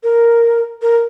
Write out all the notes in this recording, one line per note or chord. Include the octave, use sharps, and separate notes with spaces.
A#4
A#4